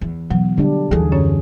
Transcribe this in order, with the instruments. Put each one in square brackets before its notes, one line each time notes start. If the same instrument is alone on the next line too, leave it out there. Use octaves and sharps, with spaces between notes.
[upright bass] E2
[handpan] B2 [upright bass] E3 [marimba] F#3
[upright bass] B2 [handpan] D3 G3 D4
[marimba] D#2 [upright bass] D3 E3 [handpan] G#4
[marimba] F#2 C#4 C#5